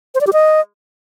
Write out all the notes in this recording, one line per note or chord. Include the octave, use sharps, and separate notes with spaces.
C5
D5
G4
D#5